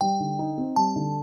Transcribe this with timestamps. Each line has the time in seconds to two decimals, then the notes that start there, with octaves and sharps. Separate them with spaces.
0.01 G3 G5
0.20 D3
0.39 D#4
0.58 C4
0.76 G3 A5
0.96 D3